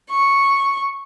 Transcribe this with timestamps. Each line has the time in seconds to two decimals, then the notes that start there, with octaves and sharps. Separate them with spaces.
0.10 C#6